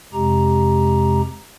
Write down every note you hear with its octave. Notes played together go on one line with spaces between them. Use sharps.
F2 C3 G#3 G4 A#5